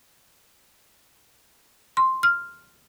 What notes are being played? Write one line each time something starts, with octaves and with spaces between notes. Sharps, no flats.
C6
F6